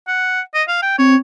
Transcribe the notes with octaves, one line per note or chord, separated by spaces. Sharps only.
F#5
D#5
F5
G5
C4 C#5